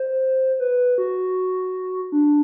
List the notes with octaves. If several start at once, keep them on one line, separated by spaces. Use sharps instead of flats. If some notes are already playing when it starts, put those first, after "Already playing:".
Already playing: C5
B4
F#4
D4